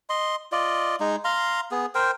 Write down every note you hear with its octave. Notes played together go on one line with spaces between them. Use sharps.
D#5 C6
F4 D5 D#5
G#3 D#4
F5 A#5 C6
B3 G#4
A#4 C5 G5